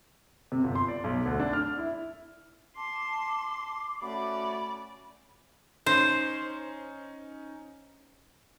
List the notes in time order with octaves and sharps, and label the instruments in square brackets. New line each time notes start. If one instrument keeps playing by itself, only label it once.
[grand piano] C3
G1
C6
D5
B1
D2
D4
F6
E4
[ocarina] A5 [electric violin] C6 [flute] D6
[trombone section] A3 C#4 F#4 [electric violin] D5 [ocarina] B5
[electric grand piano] C#4 D#4 [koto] C5